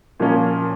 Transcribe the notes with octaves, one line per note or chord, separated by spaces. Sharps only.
A#2 F3 A#3 C#4